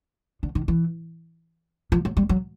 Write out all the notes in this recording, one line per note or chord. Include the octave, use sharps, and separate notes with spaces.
D3
D#3
E3
F3
F#3
G3
F#3